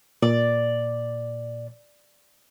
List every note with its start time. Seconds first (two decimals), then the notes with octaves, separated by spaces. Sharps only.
0.22 A#2 D5